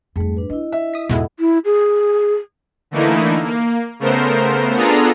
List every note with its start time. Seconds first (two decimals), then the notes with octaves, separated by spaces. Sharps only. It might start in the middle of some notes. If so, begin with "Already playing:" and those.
0.16 F2 G#2 G3 A3 G#4
0.37 D4 B4
0.50 D4 E4 D#5
0.72 E5
0.94 D#6 B6
1.09 E2 G#2 B2 G#3 E4 A4 D#5 F#5
1.39 E4
1.65 G#4
2.91 D3 E3 A3 A#3 D#4 E4
3.43 A#3
3.99 C#3 A3 B3 A#4 C5
4.75 B3 D4 F4 G#4 A4 A#5